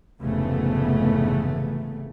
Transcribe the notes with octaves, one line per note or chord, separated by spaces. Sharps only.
F1 G#2 C#3 E3 A3 B3